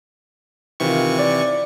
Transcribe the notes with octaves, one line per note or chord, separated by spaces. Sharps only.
C3 D#3 E3 F4 C#6
D5